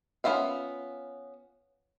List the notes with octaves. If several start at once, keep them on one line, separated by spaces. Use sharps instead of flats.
B3 C#4 F4 E5 F5